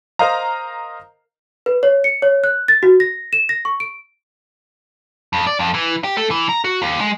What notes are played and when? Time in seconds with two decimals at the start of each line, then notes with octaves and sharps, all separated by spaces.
0.19 A#4 C5 D#5 F5 A#5
1.66 B4
1.83 C#5
2.04 C#7
2.22 C#5
2.44 F#6
2.68 A6
2.83 F#4
3.00 A#6
3.33 E7
3.49 A#6
3.65 C#6
3.80 D7
5.33 F2
5.47 D5
5.59 F2
5.74 E3
6.04 G4
6.17 A3
6.31 E3
6.49 A#5
6.64 F#4
6.82 D#2
7.01 G#3